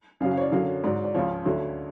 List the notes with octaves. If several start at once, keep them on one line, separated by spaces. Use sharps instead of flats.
F#2 C#3 F#3 F5
F5
C#5
D5
F#2 D3 F#3 F5
G#2 F#3 D5
D5
C#2 C#3 F3 C#5
D2 D3 F#3